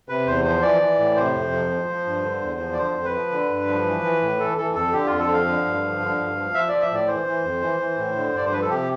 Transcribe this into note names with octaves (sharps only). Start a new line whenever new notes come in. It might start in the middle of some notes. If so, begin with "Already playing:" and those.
C3 B4
E2 C5
F3 C5
E3 D5
E3
A2
C3 C5
F2
F3
F3
F3
G2
D3
E2
F3
D5
D3 C5
F2
B4
F3
D3
G2
F3
E3
E3
A2
E3 A4
E3 A4
F2 A4
D3 G4
F2 F4
A4
F3
F5
D3
G2
F3
D3
G2
F3
F3 E5
F3 D5
E5
A2 D5
E3 C5
E3
F2
E3
E3
A2
D3
G2 D5
C5
F3 B4
A4
C3 G4